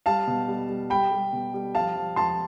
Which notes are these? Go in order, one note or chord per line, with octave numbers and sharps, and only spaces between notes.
G3 F5 A5
B2
G3
G3
G3 G5 B5
G3
B2
G3
F3 F5 A5
F3
F3 A5 C6